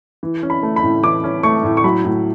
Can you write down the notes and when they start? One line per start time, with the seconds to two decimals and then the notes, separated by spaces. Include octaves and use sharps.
0.23 E3
0.43 C#4
0.50 B5
0.63 A3
0.76 B5
0.83 A2
1.03 E3 D6
1.24 C#4
1.43 A3 C#6
1.64 A2
1.77 C#6
1.84 F#3 B5
2.05 A2